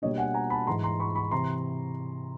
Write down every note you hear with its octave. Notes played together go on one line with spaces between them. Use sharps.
B2 G3 A#3 D4 C#5 D#5
F#5 G#5
G#5 A#5
A5 B5
G#2 E3 G#3 A#5 C6
A#5 C6
B5 C#6
B5 C#6
C3 E3 A#5 C6